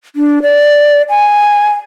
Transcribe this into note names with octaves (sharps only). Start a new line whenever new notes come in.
D4
D5
G#5